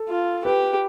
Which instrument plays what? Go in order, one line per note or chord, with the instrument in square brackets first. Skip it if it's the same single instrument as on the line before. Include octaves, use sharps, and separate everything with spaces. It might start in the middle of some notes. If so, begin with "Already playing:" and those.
Already playing: [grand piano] A4
[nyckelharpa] F4
[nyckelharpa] G4 [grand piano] B4